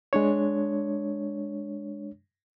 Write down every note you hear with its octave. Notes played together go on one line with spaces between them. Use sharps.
G#3 D4 C#5